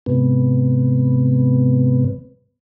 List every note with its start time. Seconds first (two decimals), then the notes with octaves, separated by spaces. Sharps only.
0.06 G#2 C3 B3